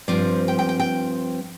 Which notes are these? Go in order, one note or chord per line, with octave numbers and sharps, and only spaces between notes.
G2 F3 C4 D5
G5
G5
G5
G5